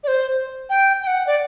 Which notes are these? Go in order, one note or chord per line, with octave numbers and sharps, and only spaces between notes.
D5
C5
G5
G5
F#5
D5